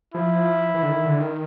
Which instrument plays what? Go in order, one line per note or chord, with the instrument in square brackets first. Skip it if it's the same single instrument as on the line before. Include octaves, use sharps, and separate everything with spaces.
[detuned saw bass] F3 [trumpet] E4
[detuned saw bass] E3
D3
D#3
D3
D#3